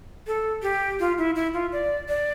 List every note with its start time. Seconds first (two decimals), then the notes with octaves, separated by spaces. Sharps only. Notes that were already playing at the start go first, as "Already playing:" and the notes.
0.27 A4
0.62 G4
1.00 F4
1.18 E4
1.35 E4
1.54 F4
1.72 D5
2.08 D5